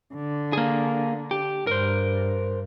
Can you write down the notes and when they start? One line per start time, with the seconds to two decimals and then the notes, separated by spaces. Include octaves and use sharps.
0.15 D3
0.53 A#3 G#4
1.31 G4
1.67 G2 A#4 C5